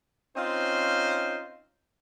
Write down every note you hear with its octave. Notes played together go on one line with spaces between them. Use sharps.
C4 C#4 D#4 F4 C5